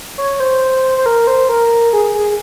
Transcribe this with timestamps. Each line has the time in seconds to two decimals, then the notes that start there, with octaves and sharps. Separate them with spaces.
0.18 C#5
0.40 C5
0.98 C5
1.06 A#4
1.27 C5
1.49 A#4
1.93 G#4
2.15 G#4